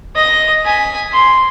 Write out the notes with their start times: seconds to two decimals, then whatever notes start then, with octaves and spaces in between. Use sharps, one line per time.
0.16 D#5 A#6
0.65 G#5 B6
1.13 C6